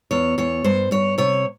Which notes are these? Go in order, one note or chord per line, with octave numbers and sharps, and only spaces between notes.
E2 C#5
E2 C#5
G2 C5
G2 C#5
C3 C#5